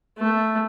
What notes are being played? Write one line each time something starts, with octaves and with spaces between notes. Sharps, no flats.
A3